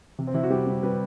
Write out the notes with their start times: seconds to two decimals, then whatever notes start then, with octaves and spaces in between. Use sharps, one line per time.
0.19 C3
0.27 C4
0.34 C3 E4
0.43 F#4
0.50 G3 G4
0.67 G3
0.83 G3 B4